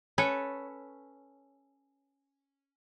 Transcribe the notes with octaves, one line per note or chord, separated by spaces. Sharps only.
C#4 A4 B4 C#5